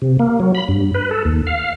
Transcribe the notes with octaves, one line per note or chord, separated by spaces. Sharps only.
C3
A#3
F#3
B5
G2
B4
A4
D#2
F5